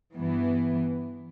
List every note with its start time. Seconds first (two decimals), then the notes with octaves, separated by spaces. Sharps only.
0.14 G2 E3 B3